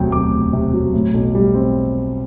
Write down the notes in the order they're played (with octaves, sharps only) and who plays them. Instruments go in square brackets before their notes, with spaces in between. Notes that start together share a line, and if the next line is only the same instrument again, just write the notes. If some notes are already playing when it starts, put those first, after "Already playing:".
Already playing: [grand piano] E1 D2 C3 F#3 G5
D2 D6
E1
C3
F#3
A2
B1
G3
C4